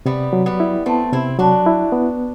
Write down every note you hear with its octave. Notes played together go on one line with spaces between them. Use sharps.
C3 G3 B3
F#3
G3 B3
E4
A3 B3 C4
C3 C4 E4
F#3 D4 F#4
E4
B3